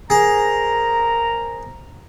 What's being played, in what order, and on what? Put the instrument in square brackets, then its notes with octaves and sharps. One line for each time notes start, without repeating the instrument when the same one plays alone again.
[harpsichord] G#4 [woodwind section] A#4 C5 A#5